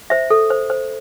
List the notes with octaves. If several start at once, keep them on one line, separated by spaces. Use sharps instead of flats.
C5 E5
A4
C5
C5